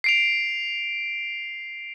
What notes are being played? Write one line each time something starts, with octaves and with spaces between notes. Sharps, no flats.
C7 D7 F7